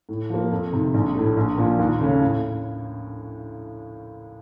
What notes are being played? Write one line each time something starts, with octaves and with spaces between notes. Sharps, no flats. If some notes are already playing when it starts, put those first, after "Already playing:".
A2
F3 A#3
F2
C3 D#3
A#1
A2 A3
A#1
A#2 F3
D#2
C#3 A3 C#4
A2